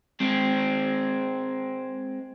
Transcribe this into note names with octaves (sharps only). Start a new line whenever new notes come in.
G#3 C4